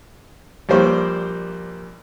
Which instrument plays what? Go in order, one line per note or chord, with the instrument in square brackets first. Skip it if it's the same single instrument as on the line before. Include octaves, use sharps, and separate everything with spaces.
[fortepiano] A#1 G3 A#3 C5 G5 C#6